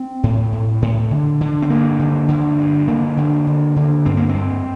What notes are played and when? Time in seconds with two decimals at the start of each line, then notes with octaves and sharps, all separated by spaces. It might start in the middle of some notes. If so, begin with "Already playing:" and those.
Already playing: C4
0.23 A2
0.53 A2
0.82 A2
1.11 D3
1.41 D3
1.62 C4
1.70 G2 A#3
1.99 D3
2.28 D3
2.58 G2
2.88 D3 A#3
3.17 D3
3.47 D3
3.76 D3
4.06 G2 C4
4.17 A#3
4.29 C4
4.35 G2